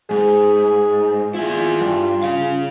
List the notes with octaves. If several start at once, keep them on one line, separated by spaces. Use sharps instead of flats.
G#2 G#4
E4 F4 G#4
G2
C#3 F5